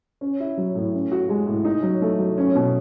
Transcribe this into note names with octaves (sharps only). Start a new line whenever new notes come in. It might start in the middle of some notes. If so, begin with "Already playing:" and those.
C#4
E4
F#3
A2
C#4
F#4
G#3
A2
D#4
F#3
A3
F#3
C#4
B2